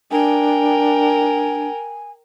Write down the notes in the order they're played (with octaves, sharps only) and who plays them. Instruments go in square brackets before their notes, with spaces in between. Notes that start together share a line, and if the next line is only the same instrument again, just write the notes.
[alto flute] D4 [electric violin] A#4 G5 [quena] G#5